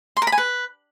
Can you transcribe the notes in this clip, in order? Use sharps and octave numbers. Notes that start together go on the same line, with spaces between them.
C6
A#4
B5
G#5
B4